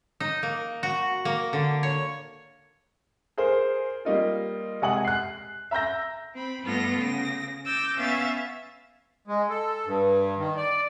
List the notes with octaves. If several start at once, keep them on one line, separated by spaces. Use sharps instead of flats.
D#4
A#3
F#4
A#3
D3
C#5
G#4 A#4 C5
G3 A#3 D#4 F4
C3 G#3 F#5 G#5 D#6 F#7
F#6 C7
E5 A#5 E6 G6 A#6
C4 B5
G2 A3 B3 F4 A4 A#6
C#3 A#6
D6 E6 G6 A6 A#6
B3 C#4 E5 F5 A6
G#3
A4
G2
D#3
D5